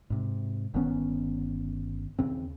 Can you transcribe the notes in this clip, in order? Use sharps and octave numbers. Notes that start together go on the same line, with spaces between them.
G#2 C3
G1 D#3 B3 C#4
D#2 C#3 C4